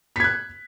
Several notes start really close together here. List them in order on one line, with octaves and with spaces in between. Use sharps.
B6 G#6 F#6